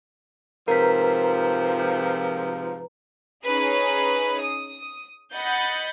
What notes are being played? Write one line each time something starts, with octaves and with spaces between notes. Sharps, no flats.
G#2 C3 F3 A#4 B4 A#5
C#4 D#4 G#4 B4
D#6
D#5 F#5 B5 G6 A6 C#7